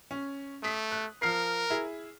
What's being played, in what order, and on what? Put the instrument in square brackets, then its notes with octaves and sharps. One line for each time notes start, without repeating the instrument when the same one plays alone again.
[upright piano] C#4
[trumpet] A3 [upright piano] D#6 B6
[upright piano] F#6
[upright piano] F3 F6 C7 [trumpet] A#4
[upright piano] E4 G#4